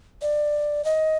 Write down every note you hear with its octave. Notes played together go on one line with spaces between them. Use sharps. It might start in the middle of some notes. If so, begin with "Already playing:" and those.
D5
D#5